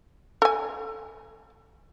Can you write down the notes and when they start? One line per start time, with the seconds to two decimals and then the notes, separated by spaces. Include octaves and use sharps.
0.42 A4 G#5